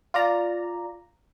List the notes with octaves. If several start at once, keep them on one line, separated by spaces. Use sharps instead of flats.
F4 D5 A#5